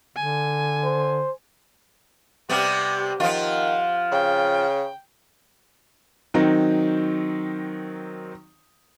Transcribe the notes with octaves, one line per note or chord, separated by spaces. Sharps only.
D3 G#5
C5
C3 G3 B3 G4
D#3 F3 F4 F#5
C#3 G5
D#3 F#3 C4 D#4